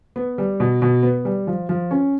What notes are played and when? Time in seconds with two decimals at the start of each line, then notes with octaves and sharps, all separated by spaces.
0.16 B3
0.38 G3
0.60 B2
0.82 B2
1.03 B3
1.25 G3
1.47 F3
1.69 F3
1.91 C#4